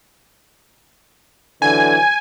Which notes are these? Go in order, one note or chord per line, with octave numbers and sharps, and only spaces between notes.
D3 E3 F#3 G#5